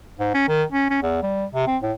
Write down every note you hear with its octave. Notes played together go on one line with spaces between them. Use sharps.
G#2
C#4
D#3
C#4
C#4
E2
G3
C3
C4
A2